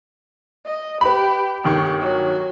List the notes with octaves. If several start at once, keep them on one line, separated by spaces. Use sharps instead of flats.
D#5
G4 B4 B5
G1 D#3 G4 C#6
F#3